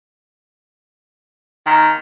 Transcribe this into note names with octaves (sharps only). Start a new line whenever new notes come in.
D#3